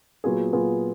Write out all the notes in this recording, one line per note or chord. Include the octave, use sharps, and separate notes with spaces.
A#2 F#3 B3 F4 G#4
A#2 F#3 B3 F4 G#4